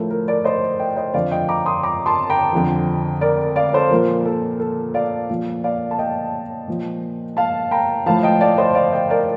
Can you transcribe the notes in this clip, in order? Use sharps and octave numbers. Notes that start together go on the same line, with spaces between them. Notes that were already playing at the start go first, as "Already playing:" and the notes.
Already playing: A2 F3 A4 A#4
A#4
A#4 D5
C5 D#5
D#5 G5
C5 D#5
F2 D3 F3 D5 F5
D#5 G5
A#5 D6
C6 D#6
A#5 D6
A5 C6
G5 A#5
F2 D3 F3
A#4 D5
D5 F5
A4 C5
A#2 F3 A#4
A4
A4
D5 F5
A#2 F3
D5 F5
A5
D#5 G5
A#2 F3
F5 A5
G5 A#5
A2 F3 F5 A5
D#5 G5
D5 F5
C5 D#5
D5 F5
D#5 G5
A#4 D5